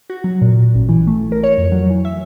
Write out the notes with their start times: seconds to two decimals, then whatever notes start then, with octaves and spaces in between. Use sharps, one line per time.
0.10 F#4
0.24 F#3
0.41 A#2
0.75 A1
0.89 E3
1.07 A3
1.32 A#4
1.43 C#5
1.58 F2
1.72 F#3
1.90 E3
2.05 E5